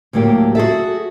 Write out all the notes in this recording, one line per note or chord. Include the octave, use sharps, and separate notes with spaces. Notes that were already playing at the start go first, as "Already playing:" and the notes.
D2 A2 F#3 A#3 G4
F#4 G#4 A4 E5